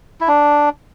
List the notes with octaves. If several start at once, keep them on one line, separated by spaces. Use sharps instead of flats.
E4
D4